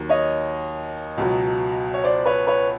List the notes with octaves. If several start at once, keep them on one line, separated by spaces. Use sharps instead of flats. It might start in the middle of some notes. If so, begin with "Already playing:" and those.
Already playing: D#2 D#3 F#3
C#5 D#5
C#2 B2 F#3
C#5
C5 D5
B4 C#5
B4 C#5